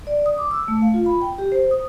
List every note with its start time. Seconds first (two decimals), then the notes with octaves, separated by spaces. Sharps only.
0.07 D5
0.26 D#6
0.38 D6
0.51 E6
0.68 A3
0.82 F5
0.94 F4
1.06 B5
1.22 G5
1.38 G4
1.52 C5
1.71 D#6